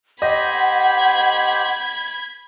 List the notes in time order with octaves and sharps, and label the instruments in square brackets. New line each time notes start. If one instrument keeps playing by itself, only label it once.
[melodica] G4 C5 [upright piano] D#5 [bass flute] F#5 [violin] B5 G#6